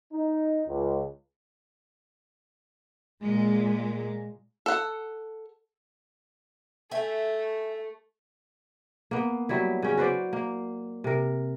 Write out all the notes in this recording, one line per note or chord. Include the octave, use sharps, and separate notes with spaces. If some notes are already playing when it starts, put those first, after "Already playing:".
D#4
C#2
A#2 G#3
A4 F#5
A3 E5 G5 G#5
A#3 B3
F#3 G3 E4
C#3 C#4
F#4 B4 C5 D5
A#3
C3 A#4